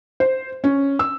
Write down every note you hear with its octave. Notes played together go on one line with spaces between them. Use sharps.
C5
C#4
E6